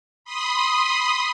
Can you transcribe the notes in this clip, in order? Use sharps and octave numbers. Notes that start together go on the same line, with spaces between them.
B5 C6 D#6